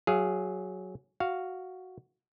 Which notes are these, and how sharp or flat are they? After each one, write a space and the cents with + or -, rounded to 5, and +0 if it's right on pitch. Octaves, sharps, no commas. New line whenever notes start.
F#3 +0 G#4 +0 F5 -30
F#4 +0 F5 +0